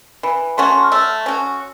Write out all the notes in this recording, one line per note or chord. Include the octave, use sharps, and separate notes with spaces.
E3 B5
A3 C#4 F#4 C6
C#6
C6
F6
A3 E6
C#4 F#4